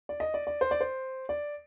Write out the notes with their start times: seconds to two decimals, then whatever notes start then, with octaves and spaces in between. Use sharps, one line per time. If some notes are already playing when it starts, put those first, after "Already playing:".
0.09 D5
0.20 D#5
0.34 D5
0.47 D5
0.61 C5
0.71 D5
0.81 C5
1.29 D5